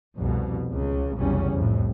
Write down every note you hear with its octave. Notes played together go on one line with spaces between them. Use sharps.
C2 F2 B2
C#2 C#3
F1 B1 E2 C#3 G3 C#4
C2 F2 A2